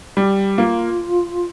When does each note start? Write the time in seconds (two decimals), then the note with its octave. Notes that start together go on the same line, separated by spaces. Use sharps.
0.17 G3
0.58 A#3 F4